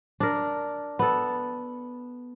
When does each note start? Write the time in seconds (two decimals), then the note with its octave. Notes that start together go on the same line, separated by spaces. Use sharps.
0.20 D4 A#4
0.99 B3 A4